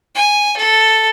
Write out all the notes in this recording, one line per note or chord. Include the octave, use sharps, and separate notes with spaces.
G#5
A4